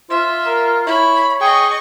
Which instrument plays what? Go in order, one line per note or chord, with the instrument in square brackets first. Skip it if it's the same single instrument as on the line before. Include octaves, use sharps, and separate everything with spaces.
[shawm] F4 [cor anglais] C5 [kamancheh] E5
[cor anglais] A#4
[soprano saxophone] E4 [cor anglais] C#5 [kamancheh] B5
[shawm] G#4 [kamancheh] D#5 C#6 [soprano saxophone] G5